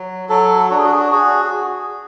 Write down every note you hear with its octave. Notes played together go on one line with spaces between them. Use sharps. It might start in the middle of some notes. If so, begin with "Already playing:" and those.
Already playing: F#3
F#3 A4
D4 F#4
G#4
F#4
G#4
F#4
F#4 G#4